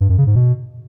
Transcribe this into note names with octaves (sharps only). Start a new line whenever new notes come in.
G2
F#2
C#3
G#2
B2